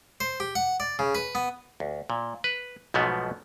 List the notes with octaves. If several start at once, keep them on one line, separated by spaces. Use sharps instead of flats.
C5
G4
F#5
D5
C#3
B4
B3
D2
A#2
B4
B1 G#2 B2 F3 A3 B3